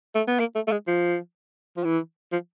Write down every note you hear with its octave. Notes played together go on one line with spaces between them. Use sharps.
A3
B3
A#3
A3
A3
G#3
F3
F3
E3
F3